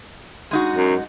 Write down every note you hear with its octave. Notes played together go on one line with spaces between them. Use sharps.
G#3 D#4 F#4
F#2